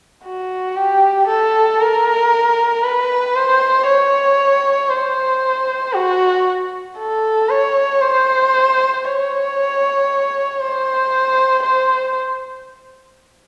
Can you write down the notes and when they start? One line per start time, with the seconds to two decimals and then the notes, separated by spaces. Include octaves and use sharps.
0.25 F#4
0.77 G4
1.28 A4
1.80 A#4
2.84 B4
3.35 C5
3.87 C#5
4.90 C5
5.94 F#4
6.98 A4
7.50 C#5
8.01 C5
9.04 C#5
10.60 C5
11.63 C5